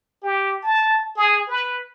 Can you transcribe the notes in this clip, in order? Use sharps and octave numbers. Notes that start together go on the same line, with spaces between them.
G4
A5
G#4
B4